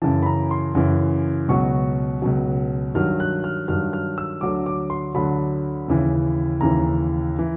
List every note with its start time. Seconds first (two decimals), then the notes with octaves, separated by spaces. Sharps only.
0.02 F#2 C#3 E3 A5
0.22 B5
0.26 A#5
0.51 C6
0.75 F#2 C#3 E3
1.48 C#2 B2 F#3 C#6
2.22 C#2 B2 F#3
2.94 G2 D#3 F#3 F6
3.20 F#6
3.44 F6
3.68 G2 D#3 F#3 F6
3.93 F6
4.18 E6
4.41 D2 D3 F#3 D6
4.66 D6
4.90 C6
5.15 D2 D3 F#3 B5
5.88 D#2 C#3 E3
6.61 D#2 C#3 E3 A#5
7.39 E3